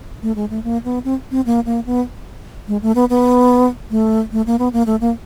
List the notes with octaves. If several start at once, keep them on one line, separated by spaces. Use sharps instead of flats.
A3
G#3
A3
A#3
B3
C4
C4
A#3
A#3
B3
G#3
A3
B3
B3
A3
A3
A#3
B3
A#3
A3
A#3